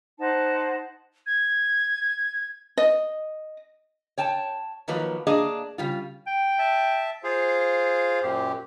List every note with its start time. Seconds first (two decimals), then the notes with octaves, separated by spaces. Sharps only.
0.19 D#4 C5 F#5 A5
1.26 G#6
2.77 D#5
4.18 C#5 G5 A5
4.88 D#3 F3 F#3 A#3 B4
5.27 A#3 D4 G#4 D#5 F5
5.78 C#3 G3 F4
6.27 G5
6.59 E5 A5
7.24 F4 G#4 C5 F5
8.23 F#2 A#2 G4